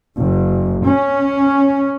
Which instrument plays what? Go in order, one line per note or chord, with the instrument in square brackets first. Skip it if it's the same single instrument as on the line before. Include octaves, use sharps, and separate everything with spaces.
[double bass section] F#1
C#4